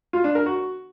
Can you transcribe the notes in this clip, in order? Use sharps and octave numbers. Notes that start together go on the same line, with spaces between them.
F4
D4
A#4
F#4